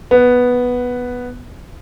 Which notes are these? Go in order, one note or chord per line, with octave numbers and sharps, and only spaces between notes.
B3